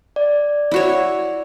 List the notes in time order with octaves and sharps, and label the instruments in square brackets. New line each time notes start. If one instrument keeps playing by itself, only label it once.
[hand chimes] D5
[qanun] E4 F#4 C#5